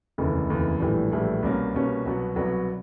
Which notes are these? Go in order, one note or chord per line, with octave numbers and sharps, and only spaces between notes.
F1 D#2 C#3 E3
F1 D#2 C#3 E3
A#1 A2 E3 G3
A#1 A2 E3 G3
C2 B2 G3 A#3 C#4
C2 B2 G3 A#3 C#4
C2 B2 F#3 B3
C2 B2 F#3 B3